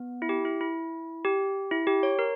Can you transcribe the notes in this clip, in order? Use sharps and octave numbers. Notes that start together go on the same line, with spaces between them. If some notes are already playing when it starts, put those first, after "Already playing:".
Already playing: B3
E4
G4
E4
E4
G4
E4
G4
C#5
A#4